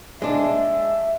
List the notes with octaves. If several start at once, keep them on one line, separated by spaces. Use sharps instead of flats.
G#3 D4 E5